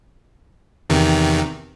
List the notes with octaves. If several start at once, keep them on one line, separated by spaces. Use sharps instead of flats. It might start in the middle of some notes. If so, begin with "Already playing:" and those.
E2 C3 D#3